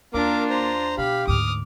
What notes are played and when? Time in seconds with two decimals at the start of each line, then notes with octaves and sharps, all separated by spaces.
0.14 D#2 A#3 D4 F4 A#4 D6
0.50 C5 A#5
0.98 B2 G4 F5 B5
1.27 D2 G#2 D6 D#6 F6